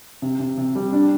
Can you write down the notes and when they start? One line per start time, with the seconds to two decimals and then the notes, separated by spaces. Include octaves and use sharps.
0.22 C3
0.39 C3
0.57 C3
0.75 G3
0.92 D4